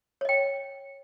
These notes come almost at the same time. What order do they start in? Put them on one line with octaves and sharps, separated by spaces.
C#5 D#5 G5